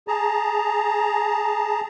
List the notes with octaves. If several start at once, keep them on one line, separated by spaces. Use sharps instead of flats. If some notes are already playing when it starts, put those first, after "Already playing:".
G#4 A5 A#5